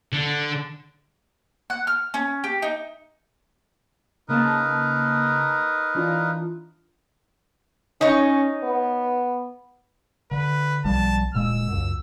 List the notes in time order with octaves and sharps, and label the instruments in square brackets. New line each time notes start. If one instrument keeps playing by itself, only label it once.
[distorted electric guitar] D3
[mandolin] F#5
F6
C#4
G4
D#4
[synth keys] C#3 A#3 A5 [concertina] D#4 A#4 B4
[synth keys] E3 D4 F4
[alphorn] C#4 [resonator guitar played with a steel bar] D#4 C#5
[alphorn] B3
[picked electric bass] D3 [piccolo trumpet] B4
[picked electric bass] B1 F3 G3 [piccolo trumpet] A5
[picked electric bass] D1 A#2 G#3 [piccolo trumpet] E6
[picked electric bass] C#2 F#2